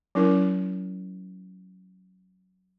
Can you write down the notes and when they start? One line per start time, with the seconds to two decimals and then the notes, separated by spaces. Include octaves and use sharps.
0.15 F#3 C#4 E4 A#4